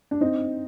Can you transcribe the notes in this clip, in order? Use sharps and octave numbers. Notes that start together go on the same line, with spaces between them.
D4
C4 D#4